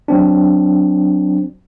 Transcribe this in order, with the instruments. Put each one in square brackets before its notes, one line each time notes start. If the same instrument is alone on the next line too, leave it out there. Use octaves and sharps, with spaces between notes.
[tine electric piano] F#3 C4 D4